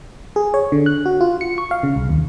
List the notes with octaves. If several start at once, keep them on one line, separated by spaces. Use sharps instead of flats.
G#4
C#5
D3
F#6
F#4
F4
C#7
C#6
F5
C#3
C2
D#2